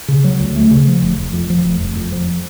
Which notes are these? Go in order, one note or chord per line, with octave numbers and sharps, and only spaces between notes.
C#3
F#3
D2
A3
C#3
F3
F1
F1
F2
F3
F1
F1
F2
F3